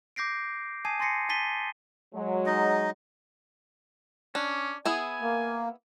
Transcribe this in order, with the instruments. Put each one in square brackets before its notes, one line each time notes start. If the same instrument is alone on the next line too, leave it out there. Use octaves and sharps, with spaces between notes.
[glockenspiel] D6 G6 A#6 C7 D7
G#5 A5 D#6 G#6 C7 D#7
G#5 C6 A6 A#6 C7 C#7
G#5 A5 A6 B6 D#7 G7
[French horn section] F#3 G#3
[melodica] D#4 D#5
[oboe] C#4 [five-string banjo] D4
[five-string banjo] B3 E4 G#4 [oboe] G#5
[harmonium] A#3